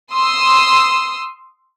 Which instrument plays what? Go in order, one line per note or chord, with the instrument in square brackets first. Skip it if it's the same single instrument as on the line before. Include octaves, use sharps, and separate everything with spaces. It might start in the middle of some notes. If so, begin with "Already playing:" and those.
[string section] C6 D#6 E6